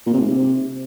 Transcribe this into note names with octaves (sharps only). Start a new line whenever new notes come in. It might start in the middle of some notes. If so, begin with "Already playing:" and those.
A#2
C3
G#2
C3